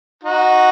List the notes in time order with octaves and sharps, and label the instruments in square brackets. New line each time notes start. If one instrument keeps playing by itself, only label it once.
[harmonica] D#4 F#4